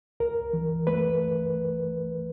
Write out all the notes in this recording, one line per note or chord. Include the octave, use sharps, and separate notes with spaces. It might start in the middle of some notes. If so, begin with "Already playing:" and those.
C#2 A#4
E3
A3 B4